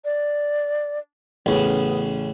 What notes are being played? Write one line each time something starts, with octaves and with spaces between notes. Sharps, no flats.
D5
A1 C#3 B3